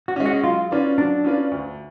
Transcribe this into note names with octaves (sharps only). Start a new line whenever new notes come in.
F#4
G#3 C#4
F#4
F#3 F4
C#4 F4 B4 D5
F#3 D4
C#4 F4 B4 D5
D2